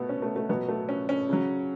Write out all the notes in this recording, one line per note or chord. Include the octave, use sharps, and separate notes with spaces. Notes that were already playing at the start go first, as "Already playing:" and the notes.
Already playing: B2 A3 B3
C#4
A3
A3
B2 F#3 B3
A3
C#4
C#4
C#3 F#3